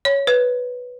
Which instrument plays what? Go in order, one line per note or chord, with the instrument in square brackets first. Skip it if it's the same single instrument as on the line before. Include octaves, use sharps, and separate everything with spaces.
[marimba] C#5
B4